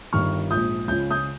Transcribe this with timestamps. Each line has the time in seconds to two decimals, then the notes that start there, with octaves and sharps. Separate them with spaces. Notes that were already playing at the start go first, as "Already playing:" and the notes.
0.13 G1 G2 D#3 C#6 F6
0.51 A#1 G#2 F3 D#6 G6
0.88 C#2 C#3 F3 G6
1.10 D#6 G6